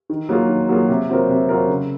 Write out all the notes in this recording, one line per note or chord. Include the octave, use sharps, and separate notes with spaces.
D#3
F#3 A#3 F4 G#4
D#3
F#3 A#3 F4 G#4
C3
F#3 C4 F4 A#4
C3
F#3 C4 F4 A#4
C#3